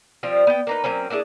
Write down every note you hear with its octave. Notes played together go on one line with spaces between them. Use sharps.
F3 G3 C4 F4
B3 G5
A#3 D#4 B4
F#3 A#3 C4 C#4
A#3 D4 E4 G#4